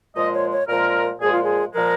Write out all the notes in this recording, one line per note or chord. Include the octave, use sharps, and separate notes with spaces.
A#2 F3 G#3 D#5
C#5
C#5
A#2 F3 G#3 A#4
A#2 F3 G#3 G#4
F4
G#4
A#2 F3 G#3 A#4